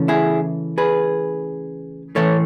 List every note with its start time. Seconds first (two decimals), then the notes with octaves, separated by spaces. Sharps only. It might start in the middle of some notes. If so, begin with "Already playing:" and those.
Already playing: C#3 E3 A3 C#4
0.08 E4 G#4
0.78 G#4 B4
2.15 A2 E3 A3 A4 C#5